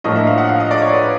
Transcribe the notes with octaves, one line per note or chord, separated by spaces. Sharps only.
A2 F3 A#3 D4 F4 D#5
E5
F5
F#5
F5
D#5
D5
C#5
B4